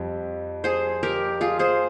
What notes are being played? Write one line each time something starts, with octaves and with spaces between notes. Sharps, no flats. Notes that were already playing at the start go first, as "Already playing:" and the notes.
Already playing: F2 G3 C4
G#4 C5
G4 A#4
F4 G#4
G#4 C5